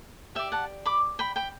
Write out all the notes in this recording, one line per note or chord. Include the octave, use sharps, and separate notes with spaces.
G4 D5 E5 G5
F#5 A5
B5 D6
G5 B5
G5 B5